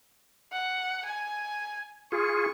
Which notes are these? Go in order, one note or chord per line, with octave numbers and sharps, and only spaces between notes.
F#5
G#5
F4 G#4 C#6